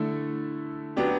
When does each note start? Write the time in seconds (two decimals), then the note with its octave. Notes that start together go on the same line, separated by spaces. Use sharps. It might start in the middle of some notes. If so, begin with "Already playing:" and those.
Already playing: D3 A3 E4 A4
0.96 F#3 B3 D4 G4